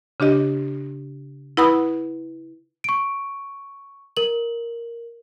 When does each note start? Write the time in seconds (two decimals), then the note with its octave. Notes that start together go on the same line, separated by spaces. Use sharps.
0.20 C#3 D4 G4 D#5
1.57 E4 B4 F#5 B5 D#6 E6
2.84 C#6 D7
4.17 A#4 F#7